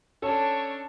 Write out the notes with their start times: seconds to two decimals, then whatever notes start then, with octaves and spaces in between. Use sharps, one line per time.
0.22 C#4 D4 A4 C#5 A5